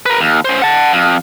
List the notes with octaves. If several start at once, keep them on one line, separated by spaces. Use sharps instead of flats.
A#4 B4
D#2
C#4 C5
F#5 A5
F2